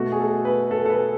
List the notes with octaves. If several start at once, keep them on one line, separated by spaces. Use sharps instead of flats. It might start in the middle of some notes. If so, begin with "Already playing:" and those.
Already playing: B2 A3 F#4
G#4
A4
B4
A4
A4
B4